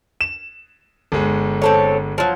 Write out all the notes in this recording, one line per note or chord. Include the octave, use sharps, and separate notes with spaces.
E7
G1 G#3
C4 A4 C#5
F3 F#3